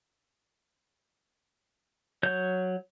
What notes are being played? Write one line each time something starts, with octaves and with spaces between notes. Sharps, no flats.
F#3 C#5 G6